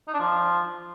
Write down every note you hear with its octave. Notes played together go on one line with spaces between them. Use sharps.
D#4
D4
F3